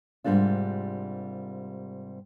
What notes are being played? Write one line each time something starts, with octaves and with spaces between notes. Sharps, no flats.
G#2 C3 G3 A#3 D4 F4